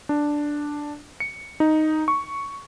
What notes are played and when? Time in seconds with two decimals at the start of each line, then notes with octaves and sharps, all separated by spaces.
0.09 D4
1.20 C#7
1.60 D#4
2.08 C#6